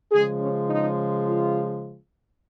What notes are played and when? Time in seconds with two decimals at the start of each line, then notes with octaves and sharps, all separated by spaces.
0.12 C#3 F3 G#3 G#4
0.41 C#4
0.70 D#4
1.28 F4